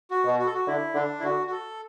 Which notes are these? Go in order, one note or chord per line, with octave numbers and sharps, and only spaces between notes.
F#4
B2
F#4
A4
F#4
D3 E4
D3 D4
E4
D3 F#4
F#4
A4